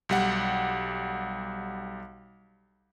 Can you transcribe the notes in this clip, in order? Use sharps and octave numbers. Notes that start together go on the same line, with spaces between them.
B1 G3 F#5